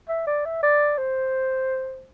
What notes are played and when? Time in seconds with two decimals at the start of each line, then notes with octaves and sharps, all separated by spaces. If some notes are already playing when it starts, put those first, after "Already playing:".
0.09 E5
0.27 D5
0.45 E5
0.63 D5
0.98 C5